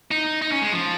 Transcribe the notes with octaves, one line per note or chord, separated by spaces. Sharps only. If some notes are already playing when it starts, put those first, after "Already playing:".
D#4
D#4
C#4
G#3
F3